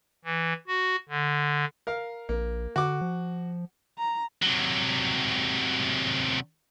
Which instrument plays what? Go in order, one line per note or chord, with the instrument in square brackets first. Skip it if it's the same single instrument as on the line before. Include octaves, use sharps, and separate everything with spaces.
[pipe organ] E3
F#4
D3
[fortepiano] A#4 F5
[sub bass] A#1 [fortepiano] A#3
[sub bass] D3 [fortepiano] F#4 D6
[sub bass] F3
[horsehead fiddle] A#5
[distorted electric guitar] C3 F#3